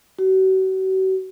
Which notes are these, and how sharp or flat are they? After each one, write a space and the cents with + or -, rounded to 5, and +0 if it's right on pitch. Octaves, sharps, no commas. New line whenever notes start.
F#4 +40